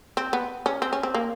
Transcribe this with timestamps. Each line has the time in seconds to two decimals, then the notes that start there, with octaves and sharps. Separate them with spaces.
0.17 C4
0.33 B3
0.66 C#4
0.82 C4
0.93 C#4
1.03 C4
1.15 A#3